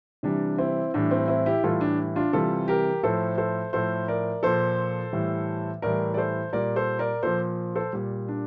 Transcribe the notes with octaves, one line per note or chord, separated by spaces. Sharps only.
C3 E3 G3 D4
C4 E4
A2 E3 G3 D4
C4
C4 E4
E4 G4
A2 E3 G3 F4 A4
D4
D4 F4
C3 E3 G3 F4 A4
G4 A#4
A2 F3 A4 C5
A4 C5
A2 F3 A4 C5
A#4 D5
A#2 F3 A4 C5
A2 E3 G3
A2 E3 G3 A#4 D5
D5
A4 C5
A#2 G3 A#4 D5
A4 C5
A#4 D5
A#2 F3 A4 C5
A4 C5
A#2 G3
D4